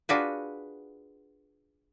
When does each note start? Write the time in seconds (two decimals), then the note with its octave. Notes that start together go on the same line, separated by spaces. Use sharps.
0.09 D4 F4 F#4 G#4 B4